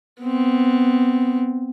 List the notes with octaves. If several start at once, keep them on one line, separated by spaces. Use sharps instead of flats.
B3 C4